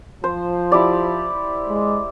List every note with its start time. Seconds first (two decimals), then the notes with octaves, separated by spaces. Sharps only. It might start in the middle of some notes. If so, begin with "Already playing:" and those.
0.24 F3 C5
0.72 E4 G4 D5
1.69 G#3